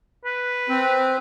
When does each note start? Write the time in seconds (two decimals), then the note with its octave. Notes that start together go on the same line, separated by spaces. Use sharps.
0.25 B4
0.69 C4